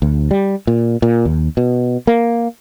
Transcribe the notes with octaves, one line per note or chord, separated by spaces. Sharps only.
D2
G3
A#2
A#2
D#2
B2
A#3